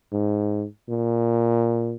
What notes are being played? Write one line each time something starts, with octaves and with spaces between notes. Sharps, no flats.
G#2
A#2